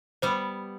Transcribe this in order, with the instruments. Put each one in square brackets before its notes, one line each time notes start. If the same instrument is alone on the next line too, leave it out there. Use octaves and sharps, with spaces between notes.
[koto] G3 B3 [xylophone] C5